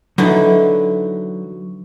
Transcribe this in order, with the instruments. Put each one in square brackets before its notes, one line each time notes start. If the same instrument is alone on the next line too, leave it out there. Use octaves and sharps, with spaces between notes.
[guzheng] D3 E3 D#4 [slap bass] F#3